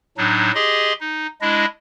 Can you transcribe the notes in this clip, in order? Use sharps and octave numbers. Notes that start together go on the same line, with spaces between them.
A2 F#3 D4 D#4
G4 G#4 D#5 C6
D#4
G#3 D4 E4 D#5